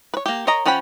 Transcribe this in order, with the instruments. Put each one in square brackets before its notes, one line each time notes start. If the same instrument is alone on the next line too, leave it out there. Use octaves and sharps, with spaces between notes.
[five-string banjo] B4 C#5
A#3 G4
A#4 C#5 D#5 A#5
F3 C#4 F#5 G5 B5